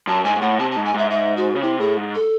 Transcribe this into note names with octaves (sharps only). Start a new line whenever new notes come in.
F#2 A5
G#2 G#5
G#2
A2 F#5
C3 A5
G#2 A5
G#5
G#2 E5
E5
F#4
C#3
C3 E4
A2 G#4
G#2
A4